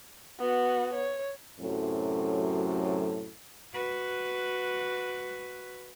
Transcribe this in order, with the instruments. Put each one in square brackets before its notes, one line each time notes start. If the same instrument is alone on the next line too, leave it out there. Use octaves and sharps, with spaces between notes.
[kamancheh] B3 F#4
C#5
[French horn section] F#2 A2 C3 F#3 A4
[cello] F#4 B4